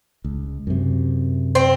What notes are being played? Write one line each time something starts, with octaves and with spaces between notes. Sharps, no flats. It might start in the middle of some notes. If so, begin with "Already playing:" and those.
C#2
F#2 C3
C4